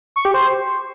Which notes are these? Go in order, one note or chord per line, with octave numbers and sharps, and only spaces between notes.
C#6
G4
C5